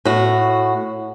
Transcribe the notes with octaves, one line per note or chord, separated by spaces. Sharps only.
A2 F#4